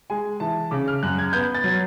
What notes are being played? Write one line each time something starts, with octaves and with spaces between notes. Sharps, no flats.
G#3 G#5
E3 A5
C#3 D6
F6
F#2 F#6
G#6
B3 G6
A6
F#3